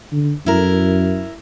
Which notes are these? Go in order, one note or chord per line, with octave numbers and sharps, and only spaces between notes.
D3
F#2 E4 A#4